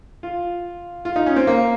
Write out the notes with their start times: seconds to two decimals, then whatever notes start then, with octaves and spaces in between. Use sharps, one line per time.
0.23 F4
1.05 F4
1.16 D#4
1.26 C#4
1.36 C4
1.47 A#3